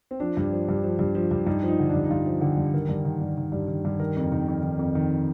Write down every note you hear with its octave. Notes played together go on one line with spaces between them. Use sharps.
C4
F3 D4
G2
F3
G2
F3
G2
F3
G2
G2 D#4
F3 D#4
D3
G2 D4
D#4
G2 F4
F3
D3 G4
G2
D#3 A#4
G2
D#3
G2
D#3
G2
D#3
G2
D#3 A#4
F2
D#3
F2
D#3
F2
D#3